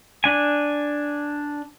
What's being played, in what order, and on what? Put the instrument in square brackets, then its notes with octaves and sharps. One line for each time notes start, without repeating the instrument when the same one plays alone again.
[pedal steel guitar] D4 G#5